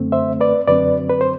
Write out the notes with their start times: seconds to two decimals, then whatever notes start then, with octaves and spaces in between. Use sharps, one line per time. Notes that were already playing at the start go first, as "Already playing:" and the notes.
Already playing: F#2 D3 A3 C4
0.12 C5 E5
0.41 B4 D5
0.67 F#2 D3 F#3 C4 B4 D5
1.10 B4
1.21 C5